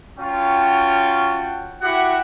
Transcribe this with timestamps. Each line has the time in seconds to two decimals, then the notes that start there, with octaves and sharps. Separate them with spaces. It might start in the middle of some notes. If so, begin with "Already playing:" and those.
0.19 C#4 F4 F#4 C#5 G5 A5
1.82 E4 F#4 G4 F#5